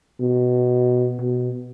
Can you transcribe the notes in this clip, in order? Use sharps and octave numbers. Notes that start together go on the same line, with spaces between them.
B2
B2